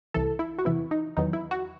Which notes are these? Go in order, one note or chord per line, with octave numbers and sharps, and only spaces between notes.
C2 C3 E3 A4
E4
F#4
E2 C3 E3 B3 E4
D#4
E2 D#3 F#3 B3 D#4
E4
F#4